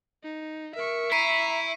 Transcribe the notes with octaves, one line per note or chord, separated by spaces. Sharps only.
D#4
A#4 E5 C#6
E4 A#5 B6 C7 D#7